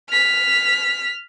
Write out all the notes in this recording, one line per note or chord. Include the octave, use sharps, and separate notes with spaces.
F6 B6